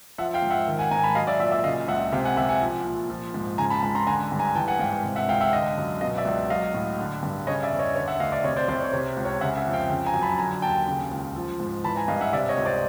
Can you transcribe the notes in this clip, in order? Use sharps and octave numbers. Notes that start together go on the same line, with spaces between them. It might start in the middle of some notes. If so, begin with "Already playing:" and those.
F3 E5 F#5
F5 G5
G#2
E5 F#5
D#3
F#5 G#5
G#2 G#5 A#5
A5 B5
F#3 D#5 F5
D5 E5
A#2 D5 E5
D5 E5
C#3 D#5 F5
C#2 E5 F#5
C3 F5 G5
F#5 G#5
C2 E5 F#5
F#5 G#5
F3
A#2
F3
G#2
C#3 G#5 A#5
A5 B5
C#2 A5 B5
A#5 C6
D3 G#5 A#5
G2
G#5 A#5
E3 G5 A5
F#5 G#5
G#2 F5 G5
C3
E5 F#5
C#2 F5 G5
E5 F#5
D3 D#5 F5
F#2
B2 D#5 F5
D5 E5
C#2
F#3 D#5 F5
A2
D3
G2
C#3 C#5 D#5
D5 E5
E2
C#5 D#5
D3 C#5
E5 F#5
D2 D#5 F5
D5 E5
C3 C#5 D#5
C5 D5
C2 C5 D5
C#5
C3 C#5
C#2
C#5
C#3 E5 F#5
E5 F#5
F2
F5 G5
C#3
G#5 A#5
F#2
A5 B5
D3 G#5 A#5
D#2 G5 A5
C#3
C#2
F3
G#2
E3 A5 B5
G#5 A#5
G2 D#5 F5
E5 F#5
C3 D5 E5
C#5 D#5
C#2
C5 D5